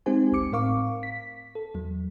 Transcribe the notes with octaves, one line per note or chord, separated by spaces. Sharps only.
G#3 C4 D#4 G4 C5 G#5
G#1 D2 D6 C#7
A2 C4 A#4 F5 C#6 D6
B6
A4
E2 F#3